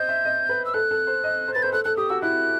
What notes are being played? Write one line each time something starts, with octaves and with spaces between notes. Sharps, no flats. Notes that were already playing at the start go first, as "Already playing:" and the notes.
Already playing: C5 D#5 G6
E5
D#5
B4
E6
A4 F#6
A4
C5
D#5
C5
B4 A6
C5 G6
A4 F#6
A4 F#6
G4 D#6
F#4 E6
E4 F#6